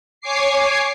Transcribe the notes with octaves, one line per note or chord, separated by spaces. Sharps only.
C#5 G#5 D6 C7